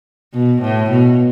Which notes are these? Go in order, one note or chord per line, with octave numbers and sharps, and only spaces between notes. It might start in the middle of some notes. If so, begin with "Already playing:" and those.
B2
A2
B2